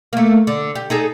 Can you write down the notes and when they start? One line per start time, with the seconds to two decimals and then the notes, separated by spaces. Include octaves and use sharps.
0.13 A3 A#3
0.47 D3
0.75 G4
0.90 D#4 G#4 A4